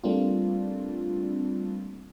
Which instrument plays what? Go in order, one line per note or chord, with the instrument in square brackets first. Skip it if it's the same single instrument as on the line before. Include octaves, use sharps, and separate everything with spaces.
[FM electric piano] G3 A3 A#3 C4 D4 F4